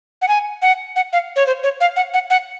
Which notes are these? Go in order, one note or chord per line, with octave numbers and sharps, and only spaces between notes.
F#5
G#5
F#5
F#5
F5
C#5
C5
C#5
F5
F#5
F#5
F#5